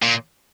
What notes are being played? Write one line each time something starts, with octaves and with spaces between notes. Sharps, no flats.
A#2